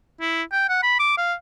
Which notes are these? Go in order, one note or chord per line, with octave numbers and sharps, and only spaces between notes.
E4
G5
F#5
B5
D6
F5